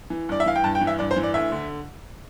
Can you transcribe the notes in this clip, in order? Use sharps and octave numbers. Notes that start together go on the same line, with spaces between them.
E3
G2 D5
E5
E3 F5
G5
G2 A5
G5
E3
E5
G2 D5
C5
E3
D5
D2 E5
D3